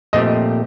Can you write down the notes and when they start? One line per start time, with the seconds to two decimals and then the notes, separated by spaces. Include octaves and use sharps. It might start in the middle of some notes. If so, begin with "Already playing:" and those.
0.13 A#2 F3 A3 C4 G4 D#5